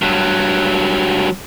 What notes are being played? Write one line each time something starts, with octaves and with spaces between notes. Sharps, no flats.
G2 F#3